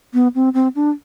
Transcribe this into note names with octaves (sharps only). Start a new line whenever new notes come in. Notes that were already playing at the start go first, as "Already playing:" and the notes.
B3
C4
C4
D4